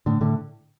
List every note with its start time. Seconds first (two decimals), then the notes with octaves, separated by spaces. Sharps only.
0.06 A2 D3
0.21 A2 D3